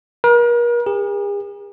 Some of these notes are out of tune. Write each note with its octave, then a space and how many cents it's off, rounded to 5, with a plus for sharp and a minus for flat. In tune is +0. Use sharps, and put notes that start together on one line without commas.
A#4 +40
G#4 -45